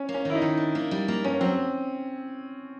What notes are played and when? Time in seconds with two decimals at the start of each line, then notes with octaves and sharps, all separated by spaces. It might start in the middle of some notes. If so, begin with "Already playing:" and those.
Already playing: C#4
0.09 A#3
0.14 C#4
0.25 D#3 E4
0.35 D#4
0.42 D#3
0.57 D4
0.75 A#3
0.91 G3
1.08 A#3
1.24 G2 C#4
1.41 F#3 C4